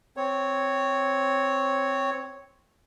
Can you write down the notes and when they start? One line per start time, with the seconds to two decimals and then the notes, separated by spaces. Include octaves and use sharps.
0.17 C4 C#5